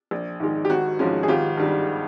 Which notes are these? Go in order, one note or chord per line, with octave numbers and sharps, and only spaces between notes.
A#1
G#2 D#3 G#3
G4
G#1 F#4
G#2 F3 G#3 C#4
G#4
G#1 F4 G4
G2 D#3 G3